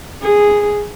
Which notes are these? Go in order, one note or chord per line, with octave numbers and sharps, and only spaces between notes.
G#4